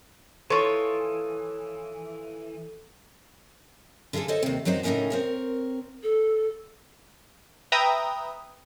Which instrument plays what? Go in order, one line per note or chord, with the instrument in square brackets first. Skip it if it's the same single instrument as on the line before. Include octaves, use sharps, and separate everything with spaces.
[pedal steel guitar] E3 [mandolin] F4 C#5 [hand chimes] A4
[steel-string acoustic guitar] D3 B3 F4 G#4 A4
A4 C5 C#5 D#5
D#2 C3
F#2 F#3 C4 D#4 C5
A2 C#3 C#4 D#4 A#4 G#5
C4 A#4 C#5
[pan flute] A4
[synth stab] B4 E5 G5 A#5 D#6